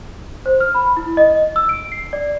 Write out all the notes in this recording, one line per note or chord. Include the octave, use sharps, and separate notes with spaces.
C5
F6
B5
E4
D#5
E6
D7
C7
D5